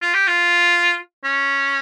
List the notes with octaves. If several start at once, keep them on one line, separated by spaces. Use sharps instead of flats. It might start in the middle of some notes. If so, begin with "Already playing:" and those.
F4
G4
F4
C#4